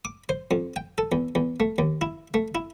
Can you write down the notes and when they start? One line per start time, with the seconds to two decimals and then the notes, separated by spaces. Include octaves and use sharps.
0.05 D6
0.29 C5
0.51 F2
0.76 G5
0.98 A4
1.12 E2
1.35 E2
1.60 A3
1.78 D#2
2.01 E4
2.34 A3
2.55 E4